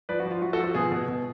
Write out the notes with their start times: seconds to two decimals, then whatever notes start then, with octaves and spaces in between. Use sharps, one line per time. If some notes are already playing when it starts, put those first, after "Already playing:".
0.09 F3 B4 D5
0.20 F#4
0.26 F3
0.31 F4
0.42 F3 F#4
0.53 F#4 A4
0.59 F3
0.64 F#4 A4
0.74 B2 F4 G#4
0.92 B2
1.08 B2